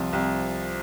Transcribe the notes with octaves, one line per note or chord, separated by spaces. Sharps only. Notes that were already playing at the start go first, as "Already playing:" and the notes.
Already playing: C2 F3
C2